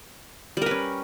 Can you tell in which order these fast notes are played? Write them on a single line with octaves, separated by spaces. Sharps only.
G3 A#4 B4 C#4